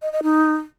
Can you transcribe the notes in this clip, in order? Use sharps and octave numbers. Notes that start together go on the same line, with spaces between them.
D#5
D#5
D#4